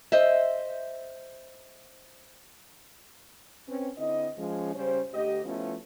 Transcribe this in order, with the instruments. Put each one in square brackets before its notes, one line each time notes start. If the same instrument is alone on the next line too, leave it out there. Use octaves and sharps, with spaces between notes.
[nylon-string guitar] C5 D#5 E5
[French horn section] C4 C#4 B4
D3 C4 E4 D#5
F3 G#3 C#4
C#3 G3 C#4 C5
D2 G4 D#5
F3 A3 B3 C#4 E4 F4